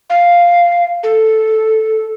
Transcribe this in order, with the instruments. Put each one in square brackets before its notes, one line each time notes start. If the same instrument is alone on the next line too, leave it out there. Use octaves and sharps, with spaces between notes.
[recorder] F5
A4